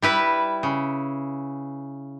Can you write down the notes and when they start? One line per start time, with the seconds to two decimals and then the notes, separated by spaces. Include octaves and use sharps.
0.02 G3 E4 B4
0.63 C#3